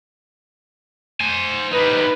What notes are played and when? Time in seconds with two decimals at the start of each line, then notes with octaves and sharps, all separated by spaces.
1.20 C5 G#5
1.72 G3 D#4 B4